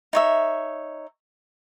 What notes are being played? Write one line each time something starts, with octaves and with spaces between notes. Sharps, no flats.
D#4 C#5 E5